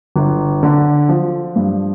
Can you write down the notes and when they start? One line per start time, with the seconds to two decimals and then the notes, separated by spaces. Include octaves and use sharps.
0.16 G1
0.63 D3
1.09 F3
1.56 G2